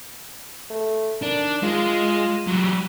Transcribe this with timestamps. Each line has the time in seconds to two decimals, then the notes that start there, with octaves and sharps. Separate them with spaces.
0.70 A3
1.22 D#3 D4
1.63 G#3 F4
2.47 F#3 G3